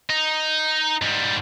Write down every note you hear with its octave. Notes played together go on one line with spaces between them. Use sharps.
D#4
G#2 G3